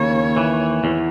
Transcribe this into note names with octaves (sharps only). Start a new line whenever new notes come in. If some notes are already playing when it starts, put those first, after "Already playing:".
Already playing: D#2 C#3 C#5
E3
E2